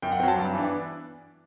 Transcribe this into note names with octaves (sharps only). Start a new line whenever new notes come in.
F#2 G5
F#5
F#3 C4 G5 A5
G2
E3 B3 D4